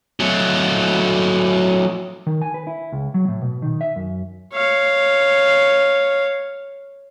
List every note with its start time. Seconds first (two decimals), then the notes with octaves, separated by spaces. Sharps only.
0.20 F#3 A3
2.27 D#3
2.42 G#5
2.54 B4
2.67 E4
2.92 C#2
3.14 F#3
3.28 A2
3.42 B2
3.62 D#3
3.81 E5
3.96 F#2
4.53 C#5 F5